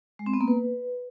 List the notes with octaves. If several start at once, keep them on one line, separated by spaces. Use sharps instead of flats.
G#3
C4
B3
A#3
B4